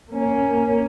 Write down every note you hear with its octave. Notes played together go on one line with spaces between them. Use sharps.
A#3 C#4